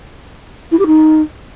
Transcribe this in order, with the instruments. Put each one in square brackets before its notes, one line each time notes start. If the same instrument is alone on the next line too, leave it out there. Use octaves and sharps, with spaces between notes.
[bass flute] E4
G4
D#4